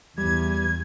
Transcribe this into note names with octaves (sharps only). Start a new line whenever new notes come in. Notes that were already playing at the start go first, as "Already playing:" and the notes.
E2 G3 G#6